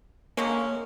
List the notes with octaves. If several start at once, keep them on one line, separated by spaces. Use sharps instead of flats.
D3 G#3 A#3 C#4